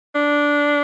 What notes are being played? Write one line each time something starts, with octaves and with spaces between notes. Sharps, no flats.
D4